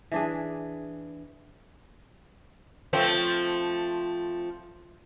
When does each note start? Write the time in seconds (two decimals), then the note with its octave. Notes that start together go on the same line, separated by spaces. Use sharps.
0.12 E3 D4 G#4
2.93 F3 A3 C4